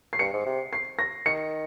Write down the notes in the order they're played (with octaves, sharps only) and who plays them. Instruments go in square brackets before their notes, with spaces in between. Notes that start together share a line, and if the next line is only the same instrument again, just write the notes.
[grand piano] C7
[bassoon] G2 [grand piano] C#7
[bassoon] G#2
C3
[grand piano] C7
A#6
[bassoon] D#3 [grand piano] C#7